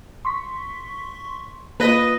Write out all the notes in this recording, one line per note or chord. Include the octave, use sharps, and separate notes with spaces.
C6 C#6 B6
A#3 F4 B4 D#5